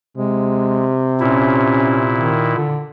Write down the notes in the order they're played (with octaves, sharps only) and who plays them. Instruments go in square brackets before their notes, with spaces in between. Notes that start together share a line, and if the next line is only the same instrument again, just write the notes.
[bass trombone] C3 [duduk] G#3
[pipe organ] A#2 E4 [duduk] C#4
[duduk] D#3
D3